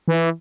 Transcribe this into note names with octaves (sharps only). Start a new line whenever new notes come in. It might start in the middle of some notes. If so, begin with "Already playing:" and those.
E3